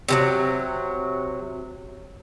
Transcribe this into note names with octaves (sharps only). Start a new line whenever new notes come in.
C3 E3 F#3